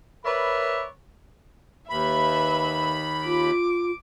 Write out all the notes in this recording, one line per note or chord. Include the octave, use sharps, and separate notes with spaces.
A#4 B4 C#5 D5 E5 B5
D#2 B4 E5 B5
F4 D6